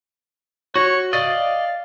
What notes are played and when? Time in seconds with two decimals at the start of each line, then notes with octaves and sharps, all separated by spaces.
0.76 F#4 C#5
1.13 D5 D#5 F5